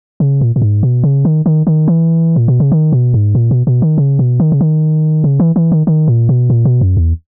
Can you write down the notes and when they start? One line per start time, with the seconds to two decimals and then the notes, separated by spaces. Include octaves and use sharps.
0.20 C#3
0.41 A#2
0.56 A#2
0.62 G#2
0.83 B2
1.03 C#3
1.25 D#3
1.46 D#3
1.67 D#3
1.88 E3
2.36 A#2
2.48 B2
2.60 C#3
2.72 D#3
2.93 B2
3.14 G#2
3.35 A#2
3.51 B2
3.67 B2
3.82 D#3
3.98 C#3
4.19 B2
4.40 D#3
4.52 C#3
4.61 D#3
5.24 C#3
5.40 E3
5.56 E3
5.72 D#3
5.87 D#3
6.08 A#2
6.29 B2
6.50 A#2
6.65 B2
6.81 F#2
6.97 E2